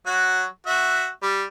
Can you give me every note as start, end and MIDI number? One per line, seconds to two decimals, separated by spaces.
0.06 0.45 54
0.06 0.45 66
0.67 1.08 66
0.67 1.08 76
1.22 1.44 55